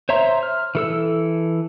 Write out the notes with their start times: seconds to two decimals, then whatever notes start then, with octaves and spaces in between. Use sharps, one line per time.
0.09 C5 C#5 E5 A#5 C6
0.43 F6
0.75 E3 A4 E6